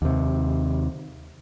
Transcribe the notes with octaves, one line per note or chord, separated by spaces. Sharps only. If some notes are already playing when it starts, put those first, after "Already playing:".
D#2 C3